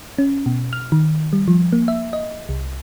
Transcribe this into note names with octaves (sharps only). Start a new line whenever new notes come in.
C#4
B2
F6
D#3
G3
F3
A#3
E5
D#5
C2